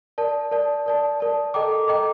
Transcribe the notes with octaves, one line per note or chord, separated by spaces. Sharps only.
A#4 D5 A5
A#4 D5 A5
A#4 D5 A5
A#4 D5 A5
A4 D#5 G5 A#5 D6
A4 D#5 G5 A#5 D6